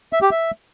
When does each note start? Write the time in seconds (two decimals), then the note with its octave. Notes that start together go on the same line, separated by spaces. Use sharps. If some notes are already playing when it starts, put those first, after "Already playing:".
0.13 E5
0.22 G4
0.31 E5